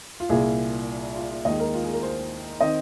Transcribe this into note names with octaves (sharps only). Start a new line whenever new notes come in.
F4
C2 A#2 A#3 G#4
F4
F4
D#2 D#3 G#3 D#5
A#4
F4
G#4
A#4
C5
D#3 C4 D#5